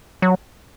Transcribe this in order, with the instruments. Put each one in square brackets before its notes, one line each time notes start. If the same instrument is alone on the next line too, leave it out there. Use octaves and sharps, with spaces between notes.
[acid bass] F#3